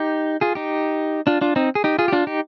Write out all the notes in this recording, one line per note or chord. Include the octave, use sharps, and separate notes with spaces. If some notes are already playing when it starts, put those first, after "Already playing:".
Already playing: D#4 G4
F4 G#4
D#4 G4
D4 F4
D4 F4
C4 D#4
G#4
D#4 G4
F4 G#4
G4
D4 F4
D#4 G4